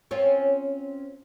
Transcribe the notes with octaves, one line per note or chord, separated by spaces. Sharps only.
C4 C#4 F4